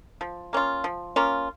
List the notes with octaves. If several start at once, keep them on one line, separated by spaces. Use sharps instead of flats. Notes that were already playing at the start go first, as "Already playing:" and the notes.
F3
A#3 C#4 F4
F3
A#3 C#4 F4